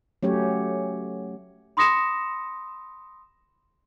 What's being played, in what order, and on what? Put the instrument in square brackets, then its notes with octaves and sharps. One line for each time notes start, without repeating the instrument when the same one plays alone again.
[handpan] F#3 A3 C#4 G4 C#5
[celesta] B5 C6 D#6 A#6 C#7 E7